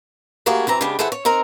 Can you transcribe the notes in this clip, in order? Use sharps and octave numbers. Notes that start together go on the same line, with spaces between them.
G2 A3 A#3 F#4 G#4
F#2 E3 C4 A#5
C#3 G#3 B3 D4 G4
E3 G#4 A4 C5 E5 F#5
C#5
C4 D#4 A#4 A#5